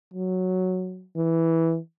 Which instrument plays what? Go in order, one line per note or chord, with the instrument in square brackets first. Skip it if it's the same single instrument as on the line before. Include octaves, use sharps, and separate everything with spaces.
[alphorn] F#3
E3